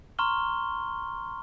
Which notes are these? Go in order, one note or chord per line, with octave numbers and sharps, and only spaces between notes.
A#5 C6 C#6 F6 G7